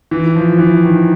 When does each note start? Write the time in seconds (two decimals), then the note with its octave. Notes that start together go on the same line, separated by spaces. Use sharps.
0.11 E3
0.36 F3
0.59 E3
0.83 D#3